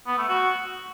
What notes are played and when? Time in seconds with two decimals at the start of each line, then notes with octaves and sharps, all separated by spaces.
0.07 B3
0.18 A3
0.29 F#4